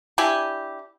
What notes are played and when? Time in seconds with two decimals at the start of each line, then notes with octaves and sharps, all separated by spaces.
0.18 D4 E4 G4 G#5